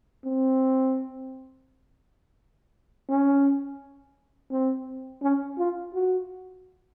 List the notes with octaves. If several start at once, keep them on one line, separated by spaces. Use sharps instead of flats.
C4
C#4
C4
C#4
F4
F#4